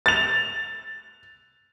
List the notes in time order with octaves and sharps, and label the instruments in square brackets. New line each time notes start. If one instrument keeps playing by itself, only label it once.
[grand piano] A6 F7